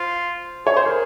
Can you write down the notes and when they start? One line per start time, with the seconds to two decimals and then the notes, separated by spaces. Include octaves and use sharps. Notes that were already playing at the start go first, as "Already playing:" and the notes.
Already playing: F4 C5
0.67 G#4 C#5
0.77 C5
0.86 A#4